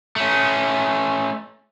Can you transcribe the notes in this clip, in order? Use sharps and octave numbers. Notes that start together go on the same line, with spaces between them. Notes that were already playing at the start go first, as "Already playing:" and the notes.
A3 C#4